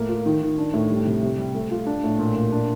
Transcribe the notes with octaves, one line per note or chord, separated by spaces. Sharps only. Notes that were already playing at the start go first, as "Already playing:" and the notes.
Already playing: A2 A#3
F4
D#3
D#3
D4
A2
G3
C3
C3
G3
A3
F4
D4
A2
A#2
A#2
D4